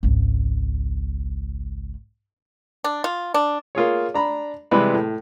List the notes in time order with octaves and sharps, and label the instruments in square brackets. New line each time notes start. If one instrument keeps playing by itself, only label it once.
[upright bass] G#1 C#2
[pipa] D4
F4
D4
[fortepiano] A#3 F4 G#4 C#5
D4 A#5 B5
C3 E3 G3 G#3 B4 B5
A2